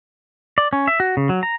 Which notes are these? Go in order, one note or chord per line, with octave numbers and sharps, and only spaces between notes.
D5
C#4
E5
F#4
C#3
F#3
A#5